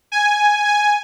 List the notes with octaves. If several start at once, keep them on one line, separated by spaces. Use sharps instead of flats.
G#5
G#5